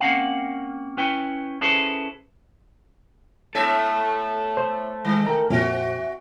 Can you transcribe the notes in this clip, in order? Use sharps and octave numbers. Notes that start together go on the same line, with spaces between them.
A#3 C4 C#4 F5 F#5
C#4 E4 B4 G5
C#4 E4 G#4 A4 B4 C5
A2 A3 B3 A4 E5
C5 C6
D#3 G#3
A#4 G5 A#5
F2 A#2 C4 F#4 E5